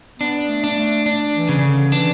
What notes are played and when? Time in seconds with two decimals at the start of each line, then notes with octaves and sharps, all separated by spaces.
0.20 B3 D4
0.49 A3
0.64 D4
0.78 A3
1.06 D4
1.35 E3
1.49 C#3
1.63 D3
1.92 E3 D4